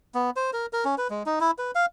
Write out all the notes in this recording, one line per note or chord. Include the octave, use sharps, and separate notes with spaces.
B3
C5
A#4
A#4
C#4
B4
G#3
D#4
E4
B4
F5